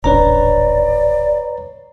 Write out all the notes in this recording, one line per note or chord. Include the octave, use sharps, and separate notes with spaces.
D#1 A1 D4 B4 C#5 D5 A#5